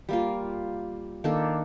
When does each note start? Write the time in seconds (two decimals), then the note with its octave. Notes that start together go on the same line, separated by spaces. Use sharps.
0.09 G3 A#3 F4
1.24 D#3 A#3 D4 A4